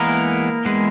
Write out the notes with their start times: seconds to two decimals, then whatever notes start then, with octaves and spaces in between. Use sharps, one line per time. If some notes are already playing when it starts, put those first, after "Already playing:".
Already playing: E3 G#3 A#3 B3 A#4
0.65 E3 G#3 B3